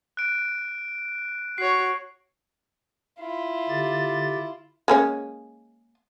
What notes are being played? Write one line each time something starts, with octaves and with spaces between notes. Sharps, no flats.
F#6 D7
F#4 C#5 C7
E4 F4
D3 G4 A6
G#3 A#3 C#4